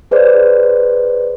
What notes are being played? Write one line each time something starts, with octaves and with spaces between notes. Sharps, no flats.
G#4 B4 C5 D5